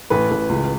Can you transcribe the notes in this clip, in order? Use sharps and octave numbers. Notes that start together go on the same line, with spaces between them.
A1 B4
A1
C#2